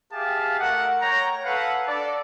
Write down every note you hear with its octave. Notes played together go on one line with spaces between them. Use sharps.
G4 G#4 E5 F5 A5
A3 A#4 F#5
C#5 G5 A#5
A4 B4 F5 F#5
D4 A4 D5